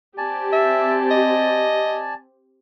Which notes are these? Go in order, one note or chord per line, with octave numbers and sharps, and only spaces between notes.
C4 G4 D5 G#5 A5
E5
D#5